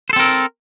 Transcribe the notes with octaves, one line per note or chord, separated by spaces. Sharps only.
C4 A4 A#4 C5